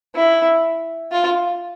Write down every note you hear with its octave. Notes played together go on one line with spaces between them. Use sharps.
E4
F4